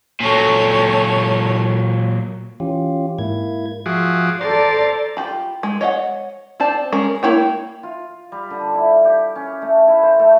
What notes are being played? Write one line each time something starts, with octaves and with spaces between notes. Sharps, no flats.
A#2 F#3 A4 C#5
E3 C#4 F4 G4
G#2 A#3 E4 G#6
F3 F#4 G#4 E5 D6
A4 C5 D5 A#5 A6
F4 G4 B5
G#3
C#5 D#5 E5 F#5
C4 C5 D5 A5
G#3 C#4 A#4
A#3 E4 C#5 G5
F4
G3
D3
E4
G4
C#4
A3
E4
C5
A3